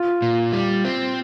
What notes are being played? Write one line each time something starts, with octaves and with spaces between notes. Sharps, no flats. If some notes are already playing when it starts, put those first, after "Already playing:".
Already playing: F4
A#2
G3
C4